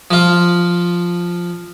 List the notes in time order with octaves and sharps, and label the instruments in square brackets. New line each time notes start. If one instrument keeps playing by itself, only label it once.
[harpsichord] F3 F4